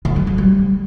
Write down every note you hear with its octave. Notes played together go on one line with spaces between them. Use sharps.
D3
F#3
C#3
G3